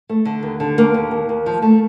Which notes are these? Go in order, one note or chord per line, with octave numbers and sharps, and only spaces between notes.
A3
D3
D#2
D3
D#2 A#3
D#2
D#2
D#2
F3
A3